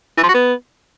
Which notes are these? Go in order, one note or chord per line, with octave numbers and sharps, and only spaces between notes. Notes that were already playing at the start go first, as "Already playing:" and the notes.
E3
F3
F#4
B3